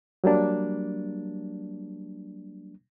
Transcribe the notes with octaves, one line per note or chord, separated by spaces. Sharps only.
F#3 G3 A#3 D4